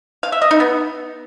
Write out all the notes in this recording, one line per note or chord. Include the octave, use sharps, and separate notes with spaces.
F5
E5
D#5
D#4
B3